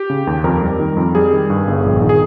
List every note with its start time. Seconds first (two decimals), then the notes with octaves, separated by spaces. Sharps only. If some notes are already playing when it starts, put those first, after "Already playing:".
Already playing: G4
0.10 C#3
0.27 D#2
0.44 F2 A#4
0.62 G3
0.80 D#3
0.97 F2
1.15 G3 G#4
1.32 D#3
1.50 G2
1.67 G1
1.84 A#1
2.01 D#3
2.09 G#4